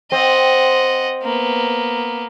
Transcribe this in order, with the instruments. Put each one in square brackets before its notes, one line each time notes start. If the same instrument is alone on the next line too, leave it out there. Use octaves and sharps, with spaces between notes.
[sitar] C4 [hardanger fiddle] D#5 F#5
[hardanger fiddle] A#3 B3